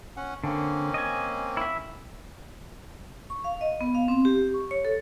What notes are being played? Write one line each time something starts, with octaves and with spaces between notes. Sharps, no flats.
C#4 F#5
D3 A#3 C4 C#4
D#5 G#5
E4 E5
C#6
F5
D#5
B3
F5
C4
G4
C#6
C#5
A4